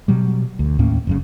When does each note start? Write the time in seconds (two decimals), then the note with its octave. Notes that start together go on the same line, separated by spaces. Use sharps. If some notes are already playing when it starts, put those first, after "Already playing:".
0.08 B2 F#3 G3
0.59 D2
0.79 D#2 A2 A#3 C#4
1.07 F1 F#2 C#3